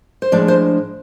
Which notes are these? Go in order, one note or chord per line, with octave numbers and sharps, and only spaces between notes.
C5
A2 F3 G#3 D4 D5
C5